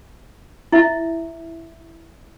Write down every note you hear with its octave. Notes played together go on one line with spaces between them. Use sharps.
E4 E5